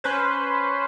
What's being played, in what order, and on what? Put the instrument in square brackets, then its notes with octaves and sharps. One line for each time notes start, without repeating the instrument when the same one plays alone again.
[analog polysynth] C#4 B4 C5